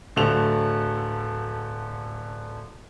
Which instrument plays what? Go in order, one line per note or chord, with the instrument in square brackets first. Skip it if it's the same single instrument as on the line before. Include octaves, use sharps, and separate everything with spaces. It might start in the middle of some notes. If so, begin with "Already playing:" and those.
[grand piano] D1 D3 A3 F#4 F7